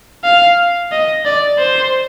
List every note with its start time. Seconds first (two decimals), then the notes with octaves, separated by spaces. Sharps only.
0.24 F5
0.92 D#5
1.25 D5
1.58 C5